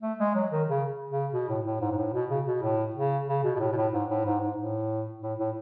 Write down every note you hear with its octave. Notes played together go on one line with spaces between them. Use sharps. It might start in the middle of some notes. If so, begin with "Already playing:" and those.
A3
G#3
F#3
D#3
C#3
C#3
B2
A2
A2
G#2
G#2
A2
B2
C#3
B2
A2
C#3
C#3
B2
B2
A2
B2
A2
G#2
A2
G#2
G#2
A2
A2
A2